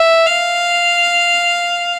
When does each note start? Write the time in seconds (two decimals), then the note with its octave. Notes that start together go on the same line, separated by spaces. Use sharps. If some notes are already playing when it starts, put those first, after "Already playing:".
Already playing: E5
0.26 F5